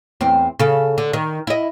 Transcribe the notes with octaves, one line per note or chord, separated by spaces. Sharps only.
E2 C4
C#3 A4
D3
D#3
E4 D#5